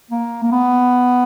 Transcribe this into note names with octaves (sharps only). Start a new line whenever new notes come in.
A#3
A#3
B3